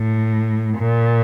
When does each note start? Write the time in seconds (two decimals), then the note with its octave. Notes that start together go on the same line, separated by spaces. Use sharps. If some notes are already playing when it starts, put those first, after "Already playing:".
Already playing: A2
0.78 A#2